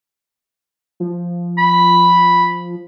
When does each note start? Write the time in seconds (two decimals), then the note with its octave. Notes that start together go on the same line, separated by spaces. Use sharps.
1.00 F3
1.58 B5